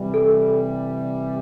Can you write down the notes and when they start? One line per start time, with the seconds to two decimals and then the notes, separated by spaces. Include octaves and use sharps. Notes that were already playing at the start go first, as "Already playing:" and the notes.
Already playing: C3 E3 G3
0.14 A4